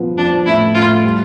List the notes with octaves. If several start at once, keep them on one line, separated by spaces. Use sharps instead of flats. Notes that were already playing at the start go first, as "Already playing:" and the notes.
Already playing: F3 B3
F3 D4
A2 E4
A2 F4
G3